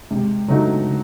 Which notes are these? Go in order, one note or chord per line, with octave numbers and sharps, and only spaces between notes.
C3 G#3
C#3 F#3 A3 D#4
C#3